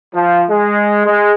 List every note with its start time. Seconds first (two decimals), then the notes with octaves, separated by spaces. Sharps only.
0.14 F3
0.50 G#3
1.06 G#3